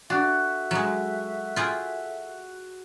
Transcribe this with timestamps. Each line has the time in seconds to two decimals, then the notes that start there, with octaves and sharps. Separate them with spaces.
0.10 D4 F#4 A4 E5
0.71 F#3 G#3
1.56 F4 G#4 G5